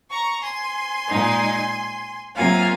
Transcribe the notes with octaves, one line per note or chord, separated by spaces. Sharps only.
A#5 C#6
G#5 C6
A#2 G#3 D#4
C3 F#3 A#3 F4 F5 G#5